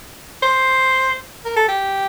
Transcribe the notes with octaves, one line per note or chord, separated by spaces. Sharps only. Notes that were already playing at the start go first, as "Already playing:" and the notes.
C5
A#4
A4
G4